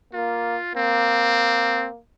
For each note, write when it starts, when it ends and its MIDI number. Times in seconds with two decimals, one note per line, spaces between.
0.13 0.56 58
0.13 0.74 65
0.75 1.98 58
0.75 1.88 60